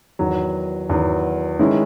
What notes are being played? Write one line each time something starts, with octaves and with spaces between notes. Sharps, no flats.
E2 D#3 F#3
E2 D#3 F#3
D#3 G#3 C#4 E4